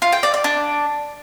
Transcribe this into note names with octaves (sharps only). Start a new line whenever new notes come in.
F4
G5
D5
D5
D4